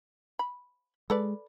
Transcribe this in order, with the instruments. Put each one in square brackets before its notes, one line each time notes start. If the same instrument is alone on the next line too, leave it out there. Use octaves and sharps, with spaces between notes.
[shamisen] B5
[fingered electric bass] G#3 [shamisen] A4 B4 D5